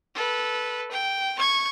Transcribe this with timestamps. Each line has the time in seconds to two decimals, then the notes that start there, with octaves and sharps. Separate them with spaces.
0.15 A4 B4
0.91 G5
1.39 C#6 G#6